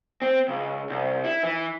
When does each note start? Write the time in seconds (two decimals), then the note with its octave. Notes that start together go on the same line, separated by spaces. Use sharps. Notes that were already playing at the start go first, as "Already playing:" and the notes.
0.22 C4
0.48 C#2
0.89 C2
1.25 E4
1.43 E3